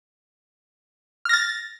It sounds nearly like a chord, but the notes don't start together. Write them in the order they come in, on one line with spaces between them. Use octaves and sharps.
F6 A#6 A6